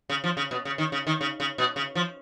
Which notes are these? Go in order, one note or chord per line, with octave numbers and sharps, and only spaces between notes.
C#3
F3
C#3
B2
C#3
D#3
C#3
D#3
C#3
C#3
B2
C#3
F3